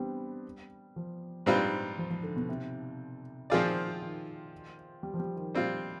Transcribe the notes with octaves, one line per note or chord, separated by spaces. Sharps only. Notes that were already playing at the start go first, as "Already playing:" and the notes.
Already playing: G3 B3 C4 D4
F3
G#2 G3 C4 F4 B4
F3
F3
D3
B2
C3
D#3 F3 C4 F4 G#4 D5
D#3
G3
F3
G3
D#3
G3 C4 F4